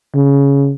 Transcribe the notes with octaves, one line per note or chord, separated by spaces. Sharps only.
C#3